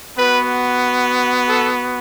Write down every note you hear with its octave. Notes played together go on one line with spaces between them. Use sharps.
B3 F#4 B4
A4